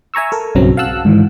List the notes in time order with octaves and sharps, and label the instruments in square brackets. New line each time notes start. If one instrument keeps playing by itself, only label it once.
[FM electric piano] E5 G#5 A#5 C#6 E6
A4 A#4
B1 G2 C#3 F#3 C4 A#5
F5 F#5 A5 E6 F#6
G#2 D#3 E3